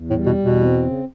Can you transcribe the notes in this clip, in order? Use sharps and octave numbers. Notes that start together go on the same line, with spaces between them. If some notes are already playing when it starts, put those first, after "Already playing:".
Already playing: E2
A2
G3
B2
E2
B2
C4
C#3